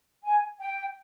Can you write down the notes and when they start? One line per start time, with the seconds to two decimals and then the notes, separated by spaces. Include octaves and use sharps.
0.24 G#5
0.59 G5